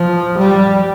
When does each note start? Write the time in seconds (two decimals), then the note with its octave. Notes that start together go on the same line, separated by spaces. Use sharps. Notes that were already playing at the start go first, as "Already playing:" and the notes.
Already playing: F3
0.38 G3